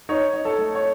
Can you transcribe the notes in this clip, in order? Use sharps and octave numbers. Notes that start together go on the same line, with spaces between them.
D#4 C#5
D#4
A4
A3
C#5